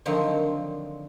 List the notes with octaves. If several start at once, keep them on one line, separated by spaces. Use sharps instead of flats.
D3 D#3 F3 F#3 C4